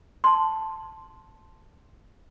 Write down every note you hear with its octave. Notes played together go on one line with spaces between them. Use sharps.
A5 C6